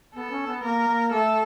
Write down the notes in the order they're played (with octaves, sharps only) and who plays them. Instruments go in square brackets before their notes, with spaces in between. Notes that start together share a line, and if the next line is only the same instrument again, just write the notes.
[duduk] B3 [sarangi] A4
[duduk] C#4
B3
[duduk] A#3 [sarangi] A#4
[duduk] A#3
[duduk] A3 [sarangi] A4